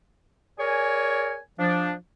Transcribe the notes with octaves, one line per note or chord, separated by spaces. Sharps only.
G#4 A#4 C#5 D5 G#5
F3 D4